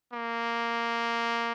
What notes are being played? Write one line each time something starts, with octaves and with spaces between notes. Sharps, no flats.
A#3